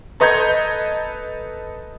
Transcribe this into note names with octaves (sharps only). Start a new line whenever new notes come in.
A4 B4 D#5 A#5 G6 G#6